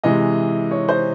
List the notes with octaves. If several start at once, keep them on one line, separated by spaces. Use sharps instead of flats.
C3 E3 G#3 D#5
C#5
C5